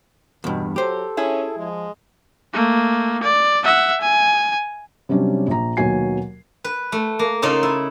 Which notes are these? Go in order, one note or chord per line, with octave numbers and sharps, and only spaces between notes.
E2 G2 B2
F#3 G4 A4 C5
C#4 E4 G#4
F3 G#3
A3 A#3
D5
E5 F#5
G#5
C3 F#3 G3 C#4 D4
A#1 A#5
D#2 B2 F#3 F#4 G#5 C7
B4
A3
A#3
C#3 D#4 F4 A5
E4